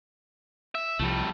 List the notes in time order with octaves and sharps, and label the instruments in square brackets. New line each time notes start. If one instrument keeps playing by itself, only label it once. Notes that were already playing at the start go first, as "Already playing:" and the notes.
[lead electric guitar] E5
[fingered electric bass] C2 F3 [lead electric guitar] G3 A3